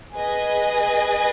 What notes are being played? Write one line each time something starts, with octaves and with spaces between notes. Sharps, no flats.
G#4 B4 D#5 G#5